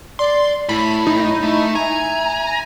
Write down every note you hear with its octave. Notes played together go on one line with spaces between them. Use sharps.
D5 C6
A2 E4 B5
D#4
A3
E5 G#5 A#5